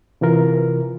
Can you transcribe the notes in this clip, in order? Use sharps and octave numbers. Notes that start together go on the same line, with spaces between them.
C3 E3 F4 A#4